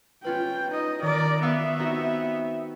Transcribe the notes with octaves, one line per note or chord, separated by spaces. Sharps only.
C#4 F4 B4 G5
D#4 D#5
D#3 A#4 D5
B3 E5 F5 C#6 E6
C4 D#4 F#4